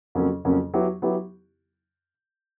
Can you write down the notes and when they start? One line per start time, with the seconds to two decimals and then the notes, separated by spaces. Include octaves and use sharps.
0.15 F2 C#3 F#3 A#3 C#4
0.45 F2 C#3 F#3 A#3 C#4
0.74 F#3 B3 E4 G4
1.02 F#3 B3 E4 G4